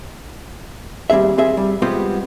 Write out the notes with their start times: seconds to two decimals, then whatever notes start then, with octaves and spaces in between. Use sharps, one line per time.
1.10 D#2 G3 C4 G#4 E5
1.38 C4 G#4 E5
1.57 G3
1.82 G3 G#3 B3 C4 F4 G4